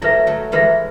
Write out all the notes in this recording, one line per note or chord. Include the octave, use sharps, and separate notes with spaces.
F#3 A3 E4 B4 E5
F#3 A3
E3 G#3 E4 B4 E5